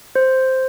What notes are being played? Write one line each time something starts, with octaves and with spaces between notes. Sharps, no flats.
C5